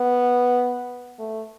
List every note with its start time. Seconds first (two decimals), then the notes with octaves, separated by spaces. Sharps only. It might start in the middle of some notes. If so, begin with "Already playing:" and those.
Already playing: B3
1.19 A3